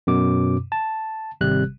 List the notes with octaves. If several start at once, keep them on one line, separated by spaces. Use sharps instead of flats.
F#2 B2 D6
A5
G#1 C3 G3 F#6